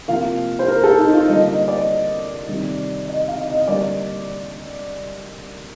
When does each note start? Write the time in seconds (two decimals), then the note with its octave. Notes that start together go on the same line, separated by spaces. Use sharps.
0.08 C3 F3 A#3 F5
0.59 C5
0.68 A#4
0.84 A4
0.98 D#4
1.13 F4
1.28 D3 G3 A#3 D#5
1.48 D#5
1.68 D5
2.48 C3 D#3 G3 C4
3.08 D#5
3.28 F5
3.47 D#5
3.67 D3 G3 A#3 D5